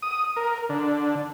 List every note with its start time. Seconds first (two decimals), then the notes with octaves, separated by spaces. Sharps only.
0.02 D#6
0.36 A#4
0.69 D3